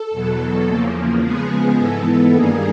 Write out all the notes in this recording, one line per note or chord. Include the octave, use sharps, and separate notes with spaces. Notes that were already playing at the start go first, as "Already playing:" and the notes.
Already playing: A4
E2 B2 F#3
E2 C#3 F3 A#3
C#3 F3 G#3 B3 G#4
G#2 E3 G#3 B3 A4
G2 D#3 G3 A#3 G#4